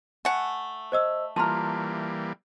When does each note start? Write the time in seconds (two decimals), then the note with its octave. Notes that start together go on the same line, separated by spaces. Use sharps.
0.25 A3 F#5 G#5
0.92 C5 D#5 E6
1.36 E3 G3 A#3 F4 A5 A#5 C6 F6